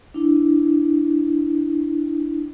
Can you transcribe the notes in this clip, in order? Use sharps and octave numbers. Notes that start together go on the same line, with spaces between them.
D4 E4